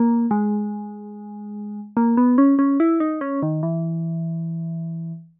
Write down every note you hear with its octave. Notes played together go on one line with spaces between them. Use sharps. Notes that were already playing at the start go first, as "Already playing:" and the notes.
Already playing: A#3
G#3
A#3
B3
C#4
C#4
E4
D#4
C#4
D#3
E3